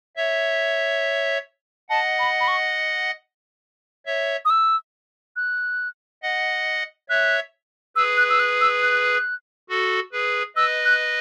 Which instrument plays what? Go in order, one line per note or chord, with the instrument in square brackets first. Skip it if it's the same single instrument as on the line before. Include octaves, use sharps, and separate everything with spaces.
[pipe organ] C#5 E5
[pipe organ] D#5 F#5 [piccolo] A5
[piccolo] B5
B5
C#6
[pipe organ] C#5 E5
[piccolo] D#6
E6
F#6
[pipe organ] D#5 F#5
[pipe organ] C#5 E5 [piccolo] F#6
[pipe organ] G#4 B4 [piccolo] E6
[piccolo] F#6
E6
F#6
E6
F#6
[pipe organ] F#4 A4
G#4 B4
[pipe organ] B4 D#5 [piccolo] E6
[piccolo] F#6